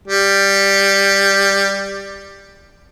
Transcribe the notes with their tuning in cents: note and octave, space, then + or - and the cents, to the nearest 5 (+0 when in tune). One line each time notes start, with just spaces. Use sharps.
G3 +10